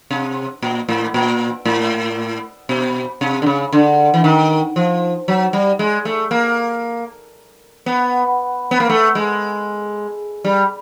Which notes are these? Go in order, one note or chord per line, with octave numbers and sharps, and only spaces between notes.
C3
A#2
A2
A#2
A2
B2
C3
D3
C#3
D3
E3
D#3
F3
F#3
G3
G#3
A3
A#3
B3
B3
A#3
A3
G#3
G3